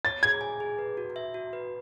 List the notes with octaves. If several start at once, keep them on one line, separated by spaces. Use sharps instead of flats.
C#5 A6
G#4 G#6
G#5
G#4
B4
F#4
E5
F#4
B4